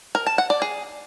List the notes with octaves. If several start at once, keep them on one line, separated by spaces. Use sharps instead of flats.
A#4
A5
F#5
D5
G#4